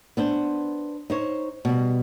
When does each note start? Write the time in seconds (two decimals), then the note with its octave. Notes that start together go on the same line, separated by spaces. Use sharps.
0.17 B3 D4 C5
1.10 D#4 C5 C#5
1.65 B2 G3